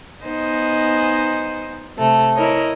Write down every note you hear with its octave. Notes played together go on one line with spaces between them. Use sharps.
B3 D#4 C5 D#5 G#5
C3 A3
E4 A#4 C#5 D#5